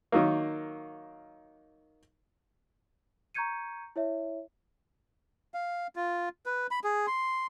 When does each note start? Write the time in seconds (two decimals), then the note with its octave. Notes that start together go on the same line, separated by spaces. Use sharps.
0.12 D#3 F#3 A#3
3.35 A#5 C#6 G6 G#6 C#7 D#7
3.96 E4 C#5 E5
5.54 F5
5.96 F4
6.46 B4
6.71 B5
6.84 G#4
7.07 C6